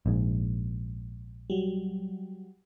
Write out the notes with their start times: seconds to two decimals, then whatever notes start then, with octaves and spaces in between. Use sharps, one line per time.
0.06 A#1 G#2
1.50 F#3 G3